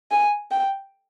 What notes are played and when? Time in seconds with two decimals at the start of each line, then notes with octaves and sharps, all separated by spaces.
0.11 G#5
0.51 G5